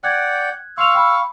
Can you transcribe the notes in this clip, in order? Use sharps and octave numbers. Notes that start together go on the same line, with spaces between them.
D5 F#5 G5 F#6 G#6
F5 C6 C#6 E6 F7
G5 B5